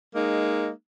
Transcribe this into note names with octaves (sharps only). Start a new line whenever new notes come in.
G#3 A#3 D#4